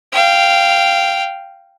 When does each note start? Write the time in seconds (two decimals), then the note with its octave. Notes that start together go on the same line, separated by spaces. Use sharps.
0.12 F5 G5